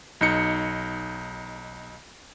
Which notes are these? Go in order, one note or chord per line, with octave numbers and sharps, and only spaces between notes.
B1 D#4 C#7